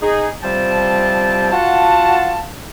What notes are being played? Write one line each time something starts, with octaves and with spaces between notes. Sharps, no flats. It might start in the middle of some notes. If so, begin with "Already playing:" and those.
D#4 G#4
C3 F3 G3 G5 A5
F4 F#4 F#5 A5